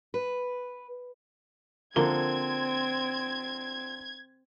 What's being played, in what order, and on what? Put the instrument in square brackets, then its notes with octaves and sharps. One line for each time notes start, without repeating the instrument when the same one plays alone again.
[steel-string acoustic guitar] B4
[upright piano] D3 F3 G7 [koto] A#3 [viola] C4 [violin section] G#6